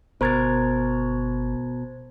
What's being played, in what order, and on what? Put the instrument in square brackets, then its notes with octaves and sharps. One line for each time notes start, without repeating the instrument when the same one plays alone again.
[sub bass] G1 [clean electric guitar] B2 A#4 [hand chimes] C5 G#6 A6